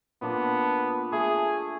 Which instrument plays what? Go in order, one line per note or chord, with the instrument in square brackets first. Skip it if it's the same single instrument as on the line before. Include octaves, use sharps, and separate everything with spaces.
[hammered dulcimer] A#2 D4 A5 [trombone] B3
[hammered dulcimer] A3 [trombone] G#4